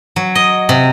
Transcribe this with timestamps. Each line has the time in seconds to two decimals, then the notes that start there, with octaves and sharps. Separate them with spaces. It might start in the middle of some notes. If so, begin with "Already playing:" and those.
0.16 F#3
0.35 D#5
0.69 C3